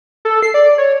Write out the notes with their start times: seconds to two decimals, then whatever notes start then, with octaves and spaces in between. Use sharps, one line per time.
0.25 A4
0.43 C7
0.54 D5
0.78 C#5